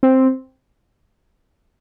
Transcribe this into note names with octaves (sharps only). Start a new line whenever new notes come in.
C4